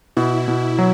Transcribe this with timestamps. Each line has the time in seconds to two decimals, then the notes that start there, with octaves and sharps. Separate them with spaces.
0.17 B2 E4
0.48 B2
0.79 F#3